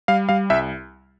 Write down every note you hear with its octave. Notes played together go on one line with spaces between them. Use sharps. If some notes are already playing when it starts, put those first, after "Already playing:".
G3 F5
G3 F5
C2 E5